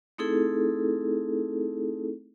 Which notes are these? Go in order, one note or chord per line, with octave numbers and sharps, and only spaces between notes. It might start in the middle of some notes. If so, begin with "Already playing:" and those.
A3 C4 D#4 E4 G#4 A4